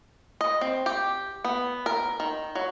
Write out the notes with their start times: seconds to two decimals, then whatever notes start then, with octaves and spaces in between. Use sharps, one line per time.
0.41 D#5
0.61 C4
0.86 G4
1.45 B3
1.86 A#4
2.20 D#3
2.55 F#3